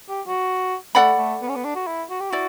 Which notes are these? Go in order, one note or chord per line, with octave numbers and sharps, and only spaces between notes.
G4
F#4
A3 A4 D5 F#5 B5
A3
B3
C#4
B3
D4
F#4
E4
F#4
G4
E4 F#4 D5